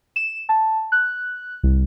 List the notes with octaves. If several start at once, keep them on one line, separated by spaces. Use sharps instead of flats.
E7
A5
F#6
C2